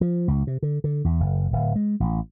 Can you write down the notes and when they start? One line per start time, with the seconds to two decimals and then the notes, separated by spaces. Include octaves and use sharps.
0.01 F3
0.28 C#2
0.47 C3
0.62 D3
0.84 D3
1.04 E2
1.20 F#1
1.52 D1
1.76 G#3
2.00 A1